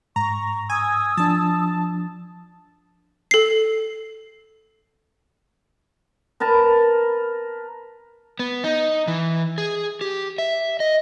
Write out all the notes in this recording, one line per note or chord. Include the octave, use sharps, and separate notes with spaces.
G#2 A#5 C#6
G#5 D#6 E6
F3 D4 A5
A4 C7
A#4 B4 A5 A#5
B3
D#4
E3
G#4
G4
E5
D#5